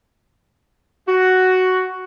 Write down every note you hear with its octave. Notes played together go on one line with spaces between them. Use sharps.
F#4